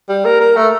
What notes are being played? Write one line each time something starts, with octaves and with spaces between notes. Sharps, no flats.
G3
A#3
A#3
A3